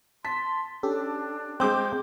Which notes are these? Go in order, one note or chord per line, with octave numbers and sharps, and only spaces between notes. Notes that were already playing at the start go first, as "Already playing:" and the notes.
A5 C6 B6
C#4 D4 G4 A4
G#3 C4 D6 G6